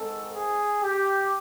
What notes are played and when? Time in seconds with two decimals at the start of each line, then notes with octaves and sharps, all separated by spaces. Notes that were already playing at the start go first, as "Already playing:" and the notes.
Already playing: G#2 D#3 G#3 C4 A4
0.33 G#4
0.83 G4